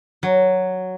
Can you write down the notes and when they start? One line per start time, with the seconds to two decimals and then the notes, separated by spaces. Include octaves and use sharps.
0.23 F#3